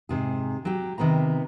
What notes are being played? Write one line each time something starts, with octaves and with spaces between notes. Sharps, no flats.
G#2 C3 G#4
F#3 G4
C3 D#3 B3 C5 A#5